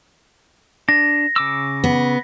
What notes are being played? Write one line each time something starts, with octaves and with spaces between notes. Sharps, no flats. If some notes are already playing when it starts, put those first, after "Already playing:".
D4 A#6
C#3 D6 E6
B3